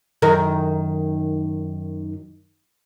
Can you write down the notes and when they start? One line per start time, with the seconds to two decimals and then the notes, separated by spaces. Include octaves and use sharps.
0.22 F#2 D#3 A#4